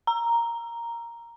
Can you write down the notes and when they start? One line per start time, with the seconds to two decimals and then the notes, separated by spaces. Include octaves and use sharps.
0.07 A#5